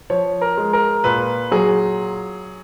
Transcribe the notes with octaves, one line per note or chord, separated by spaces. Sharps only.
F3 C#5
A#4
G#3
A#4
A#2 B4
F#3 G#4